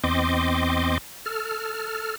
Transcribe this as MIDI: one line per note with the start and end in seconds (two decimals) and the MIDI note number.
0.04 0.98 40
0.04 0.98 60
0.04 0.98 75
0.04 0.98 84
0.04 0.98 86
1.26 2.16 69
1.26 2.16 89